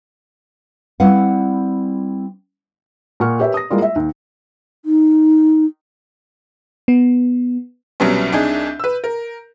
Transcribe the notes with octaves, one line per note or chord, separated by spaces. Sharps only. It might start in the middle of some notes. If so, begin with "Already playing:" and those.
G3 C4 E4 B4 F5 F#5
A#2 F#5 C#6 F6
G4 A#4 B4 C#5 E5
D#6 A#6
G3 G#3 A#3 E4 F4 D5
E5
D#2
D#4
B3
C2 B2 F#3 G3 B3 C#4
C2 D4 D#4 G#4 G6
B4 E6
A#4